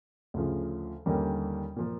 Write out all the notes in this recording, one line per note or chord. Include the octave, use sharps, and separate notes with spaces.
D2 C#3 F3
D#2 D3 G3 A#3 C#4
A#2 F3 A#3